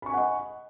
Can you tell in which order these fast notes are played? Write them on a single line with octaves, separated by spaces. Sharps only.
B5 C#6 G#5 F#5 D#5